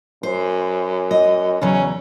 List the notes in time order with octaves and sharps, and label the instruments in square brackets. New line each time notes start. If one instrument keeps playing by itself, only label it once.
[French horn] F#2 [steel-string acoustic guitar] C5
[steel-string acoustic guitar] D#5
[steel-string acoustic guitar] E2 C#3 F#3 [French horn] C#4